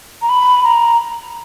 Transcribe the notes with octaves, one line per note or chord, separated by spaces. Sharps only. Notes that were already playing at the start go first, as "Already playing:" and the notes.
A#5
B5
A#5